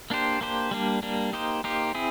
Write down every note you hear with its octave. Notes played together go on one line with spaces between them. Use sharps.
A#3 D4 G4 C5
A#3 D4 G4 C5
G3 A#3 D4
G3 A#3 D4
A#3 D#4 G4 C5
A#3 D#4 G4 C5
C4 E4 G#4